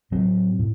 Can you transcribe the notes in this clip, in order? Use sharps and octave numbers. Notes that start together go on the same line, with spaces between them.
A2 F#3 C4
A2